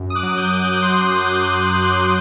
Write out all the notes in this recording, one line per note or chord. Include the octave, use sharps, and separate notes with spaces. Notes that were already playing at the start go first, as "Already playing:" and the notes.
Already playing: F#2
D#6
D6 F#6
F#3
D#6 G6
F#2
D6 F#6
F#3 C6 D#6
F#2
F#2
F#2